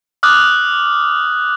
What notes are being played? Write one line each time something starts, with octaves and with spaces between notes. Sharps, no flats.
D6 D#6 F6 F#6